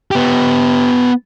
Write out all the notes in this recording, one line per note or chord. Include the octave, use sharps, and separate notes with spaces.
B3 G4